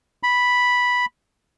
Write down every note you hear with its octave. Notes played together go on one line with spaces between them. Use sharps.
B5